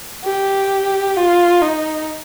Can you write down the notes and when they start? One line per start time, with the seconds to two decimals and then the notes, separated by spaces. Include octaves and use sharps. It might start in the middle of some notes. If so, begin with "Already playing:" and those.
0.24 G4
1.17 F4
1.62 D#4